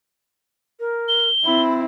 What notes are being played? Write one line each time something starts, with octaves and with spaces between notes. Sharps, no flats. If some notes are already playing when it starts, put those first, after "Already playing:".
A#4
G7
C4 E4 B5